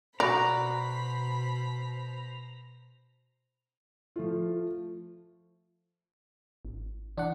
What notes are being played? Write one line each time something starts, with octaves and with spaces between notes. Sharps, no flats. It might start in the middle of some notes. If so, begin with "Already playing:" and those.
B2 F#4 A#4 C5 D5 A#5 B5
F3 A3 F4
G#1
E3 D4 F#5